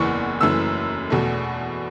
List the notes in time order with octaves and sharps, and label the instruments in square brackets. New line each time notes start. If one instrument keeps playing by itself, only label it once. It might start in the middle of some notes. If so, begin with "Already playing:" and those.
Already playing: [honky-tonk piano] F#1 E2 E3 C#6
F#1 F#2 E3 A3 E6
E2 B2 A3